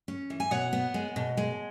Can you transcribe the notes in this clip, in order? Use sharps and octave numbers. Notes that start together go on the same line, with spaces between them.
C#4
E3
G#5
B2 C#5 F#5
B3
G#3
B2
G#3